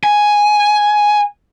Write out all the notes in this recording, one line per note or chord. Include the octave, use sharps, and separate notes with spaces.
G#5